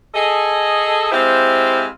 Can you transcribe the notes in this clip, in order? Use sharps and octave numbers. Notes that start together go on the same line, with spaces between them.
G#4 A4 D#5
G#3 C4 E4 G4 C5 F5